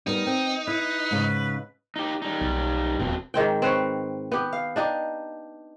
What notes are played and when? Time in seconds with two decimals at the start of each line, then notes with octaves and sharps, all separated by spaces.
0.07 G3 B3 D#4 A#4
0.27 C4 G5
0.67 E4 B4
1.11 G#2 C#3
1.96 D#4 G4
2.22 G3 D#4
2.41 B1
2.99 D#1 F2 B2 C4
3.34 G#2 D#3 C4 G5
3.62 C4 B4 C#5
4.32 B3 G4
4.53 F5
4.76 D4 D#4 G4